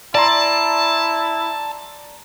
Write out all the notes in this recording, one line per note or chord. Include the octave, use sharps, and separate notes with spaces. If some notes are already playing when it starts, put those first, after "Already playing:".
E4 D5 A5 A#5 C6